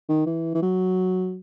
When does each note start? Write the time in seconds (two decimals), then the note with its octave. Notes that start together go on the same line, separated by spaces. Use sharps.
0.09 D#3
0.26 E3
0.55 E3
0.62 F#3